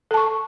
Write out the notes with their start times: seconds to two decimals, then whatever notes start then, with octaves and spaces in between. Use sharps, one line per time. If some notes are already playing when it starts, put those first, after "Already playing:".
0.11 A4
0.14 A5
0.17 C#6